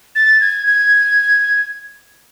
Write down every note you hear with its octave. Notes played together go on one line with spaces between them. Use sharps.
A6
G#6
G#6